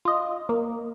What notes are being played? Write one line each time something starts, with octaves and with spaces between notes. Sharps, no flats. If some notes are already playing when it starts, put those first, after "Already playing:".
F4 D#5
A#3